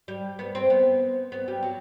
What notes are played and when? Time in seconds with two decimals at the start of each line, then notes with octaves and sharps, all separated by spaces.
0.08 G3
0.39 B3
0.55 C4
0.70 B3
1.32 B3
1.48 G3
1.63 F#3